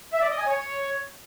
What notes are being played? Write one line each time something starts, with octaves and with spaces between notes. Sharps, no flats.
E5
D5
D#5
G#5
C#5